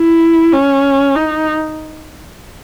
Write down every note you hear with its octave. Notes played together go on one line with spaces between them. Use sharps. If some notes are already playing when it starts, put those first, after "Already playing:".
Already playing: E4
C#4
D#4